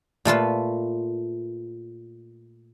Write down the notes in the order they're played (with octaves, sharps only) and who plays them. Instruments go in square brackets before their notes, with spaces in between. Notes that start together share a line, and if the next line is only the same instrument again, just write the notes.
[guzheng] A#2 A3 F4 B4